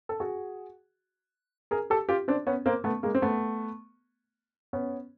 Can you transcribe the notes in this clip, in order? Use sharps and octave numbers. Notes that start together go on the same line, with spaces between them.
A4
F#4 G#4
G#4 A#4
G4 A4
F4 G4
C4 D4
B3 C#4
A#3 C4
A3 B3
G#3 A#3
C4
A3 B3
B3 C#4